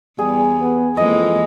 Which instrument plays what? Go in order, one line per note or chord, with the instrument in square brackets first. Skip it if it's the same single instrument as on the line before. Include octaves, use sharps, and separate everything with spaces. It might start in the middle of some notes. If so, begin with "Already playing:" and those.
[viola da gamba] E2 [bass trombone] G3 [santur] G#4
[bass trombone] B3
[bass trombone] F2 [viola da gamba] E3 G#3 A#3 [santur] D#5